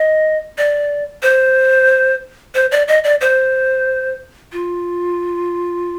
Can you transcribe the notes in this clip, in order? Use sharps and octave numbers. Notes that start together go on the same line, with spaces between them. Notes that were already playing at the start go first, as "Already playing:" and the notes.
Already playing: D#5
D5
C5
C5
D5
D#5
D5
C5
F4